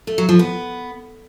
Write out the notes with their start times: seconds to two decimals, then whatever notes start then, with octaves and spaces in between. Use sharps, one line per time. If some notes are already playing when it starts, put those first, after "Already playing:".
0.07 A3
0.18 F#3
0.29 F3
0.39 B3